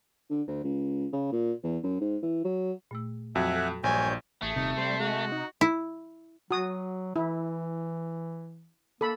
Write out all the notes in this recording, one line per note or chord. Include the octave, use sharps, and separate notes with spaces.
D3
D2
C#2
C#3
A#2
E2
F#2
G#2
E3
F#3
A#2 A3 E6
F2 F#3 F#4 E5 F#5 G#5
A4 F#6
A#1 G2 C#5 G#5 G6
A1 A3 G#4
D#1 C3 D#4
G3 C5
G#3 F#4
D#4
E4
F#3 F#4 D#6
E3 E4
A#3 A4 B5